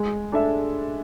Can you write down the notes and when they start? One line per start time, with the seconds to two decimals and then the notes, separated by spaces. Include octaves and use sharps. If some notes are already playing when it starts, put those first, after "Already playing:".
Already playing: G#3
0.32 D4 A4 E5